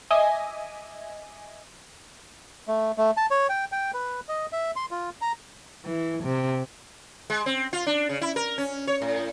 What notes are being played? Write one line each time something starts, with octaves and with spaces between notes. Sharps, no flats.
D#5 E5 G#5 D6 D#6
A3
A3
A5
C#5
G5
G5
B4
D#5
E5
C6
F4
A#5
E3
C3
G#3
C4
F4
D4
C#3
E4
A#4
C#4
C#5
A2